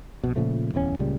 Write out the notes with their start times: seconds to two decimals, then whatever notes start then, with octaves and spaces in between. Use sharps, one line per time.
0.24 A#1 B2
0.36 A#2 C#3 F3 A3
0.74 D1 E2 D#3 C#4
0.99 C#2 A#2 C#3 G3